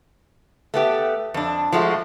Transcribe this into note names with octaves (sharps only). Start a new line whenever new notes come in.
A3 B3 G4
F2 D4
F3 G#3 A3 F#4